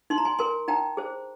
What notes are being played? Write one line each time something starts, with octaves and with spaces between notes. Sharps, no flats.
D#4 C6
A#5
G#5 C6
A#4 G#5 C6
D#4 G5 A#5
G#4 C5